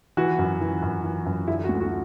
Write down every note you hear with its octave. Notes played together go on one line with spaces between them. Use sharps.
E3 F#4
F#2
E3
F#2
E3
F#2
D3 E4
F#4
D2
F#4